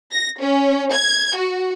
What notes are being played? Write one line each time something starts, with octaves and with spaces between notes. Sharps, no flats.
A#6
C#4
G#6
F#4